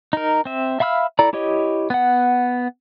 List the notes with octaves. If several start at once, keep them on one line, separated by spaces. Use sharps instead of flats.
D#4 A#4
C4 E5
E5 F5 B5 E6 F6
E4 A4 D5 A#5
E4 G4 C#5 D#5
B3 F#5